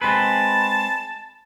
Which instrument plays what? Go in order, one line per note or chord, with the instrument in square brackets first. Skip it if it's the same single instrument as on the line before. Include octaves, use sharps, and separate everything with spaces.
[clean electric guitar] G#3 C4 B4 [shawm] A5